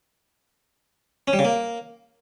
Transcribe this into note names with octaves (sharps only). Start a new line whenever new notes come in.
C#4
G3
C#3
A#3